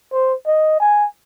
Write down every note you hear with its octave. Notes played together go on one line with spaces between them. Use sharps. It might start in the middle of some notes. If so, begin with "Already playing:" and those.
C5
D#5
G#5